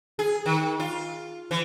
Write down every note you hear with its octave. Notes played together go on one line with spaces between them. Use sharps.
G#4
D#3
F4
E3